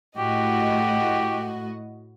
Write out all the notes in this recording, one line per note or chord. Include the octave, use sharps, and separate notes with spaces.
A2 F#4 G4 D#5